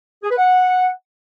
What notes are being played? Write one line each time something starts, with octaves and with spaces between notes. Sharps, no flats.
G#4
B4
F#5